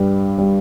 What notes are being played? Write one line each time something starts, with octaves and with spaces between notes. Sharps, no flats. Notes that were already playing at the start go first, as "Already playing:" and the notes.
Already playing: G2 G3
G3